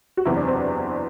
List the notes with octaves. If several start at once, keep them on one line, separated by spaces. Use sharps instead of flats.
F#4
F#1 E2 C3 E3 E4
D4
C4